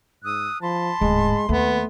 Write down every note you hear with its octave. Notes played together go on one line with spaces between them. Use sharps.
G#2 D#6 E6 F#6
F3 A5 B5 C6
D1 G#2 G#3
D#2 A3 B3